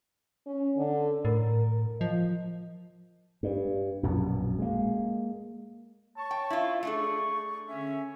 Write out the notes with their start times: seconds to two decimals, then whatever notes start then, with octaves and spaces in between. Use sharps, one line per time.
0.46 C#4
0.78 D3
1.25 A2 A#4
2.01 F3 D#5
3.43 G2
4.03 A#1 F#2 B2
4.59 G#3 A#3
6.16 C#5 A5 C#6
6.31 G5
6.50 E4 F4
6.83 A3 D4 G#4 A4 C#6
7.68 D3 C#4 E5